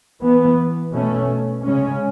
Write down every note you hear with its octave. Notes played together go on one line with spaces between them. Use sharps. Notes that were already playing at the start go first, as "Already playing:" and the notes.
E3 B3
B2 A3 C#4
C#3 G#3 C#4